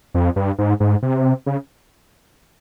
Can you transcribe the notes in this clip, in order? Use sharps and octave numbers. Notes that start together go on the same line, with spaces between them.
F2
G2
G#2
G#2
C3
C#3